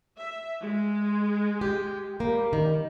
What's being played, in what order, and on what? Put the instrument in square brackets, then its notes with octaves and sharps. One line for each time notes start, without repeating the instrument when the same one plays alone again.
[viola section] E5
G#3
[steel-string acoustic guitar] G4
[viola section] G3 [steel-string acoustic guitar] A#3
[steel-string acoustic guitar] D#3